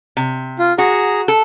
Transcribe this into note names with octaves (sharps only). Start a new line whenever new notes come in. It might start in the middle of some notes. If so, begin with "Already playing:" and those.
C3
F4
F#4 G#4 A#5
A4